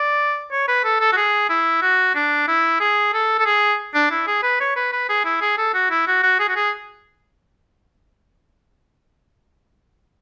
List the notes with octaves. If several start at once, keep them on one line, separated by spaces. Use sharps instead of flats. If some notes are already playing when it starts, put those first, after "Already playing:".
Already playing: D5
C#5
B4
A4
A4
F#4
G#4
E4
F#4
D4
E4
G#4
A4
A4
G#4
D4
E4
G#4
B4
C#5
B4
B4
G#4
E4
G#4
A4
F#4
E4
F#4
F#4
G#4
F#4
G#4